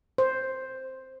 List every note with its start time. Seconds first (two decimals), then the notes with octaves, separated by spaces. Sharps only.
0.18 C5